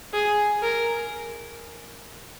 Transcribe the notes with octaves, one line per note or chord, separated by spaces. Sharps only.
G#4
A#4